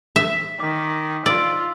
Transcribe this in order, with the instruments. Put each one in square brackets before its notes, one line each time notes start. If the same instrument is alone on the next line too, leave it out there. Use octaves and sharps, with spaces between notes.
[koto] E5 [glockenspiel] B6
[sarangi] D#3 [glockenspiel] D6 B6
[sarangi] F4 [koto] D5 [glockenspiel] E6